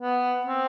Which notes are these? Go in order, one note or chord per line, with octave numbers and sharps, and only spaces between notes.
B3
C4